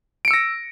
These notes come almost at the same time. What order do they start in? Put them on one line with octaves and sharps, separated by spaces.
D7 C#7 E6 A#6